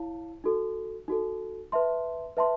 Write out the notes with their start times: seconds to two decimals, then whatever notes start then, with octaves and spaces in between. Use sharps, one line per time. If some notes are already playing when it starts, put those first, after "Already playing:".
Already playing: E4 C#5 F5 A5
0.44 D#4 F#4 A4
1.08 D#4 F#4 A4
1.72 B4 E5 A5 C6
2.37 B4 E5 A5 C6